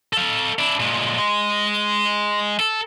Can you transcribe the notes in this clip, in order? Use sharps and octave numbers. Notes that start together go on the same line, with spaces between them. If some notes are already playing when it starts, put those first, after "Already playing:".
A4 F5
D4 E4
A#2 G#3
G#3
A4